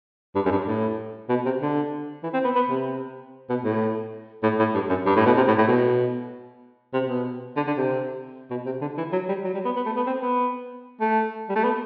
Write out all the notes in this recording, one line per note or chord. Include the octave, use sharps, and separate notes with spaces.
G2
F#2
G2
A2
B2
C3
D3
E3
C4
B3
B3
C3
B2
A2
A2
A2
G2
F#2
G2
A2
B2
C3
A2
A2
B2
C3
B2
D3
D3
C3
B2
C3
D3
E3
F#3
G3
F#3
G3
B3
B3
A3
B3
C4
B3
A3
G3
A3
B3